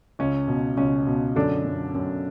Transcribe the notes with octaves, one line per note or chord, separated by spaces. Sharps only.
C#2 C#4
B2
C#2 C#4
B2
F#2 D3 D4
F#2
F#2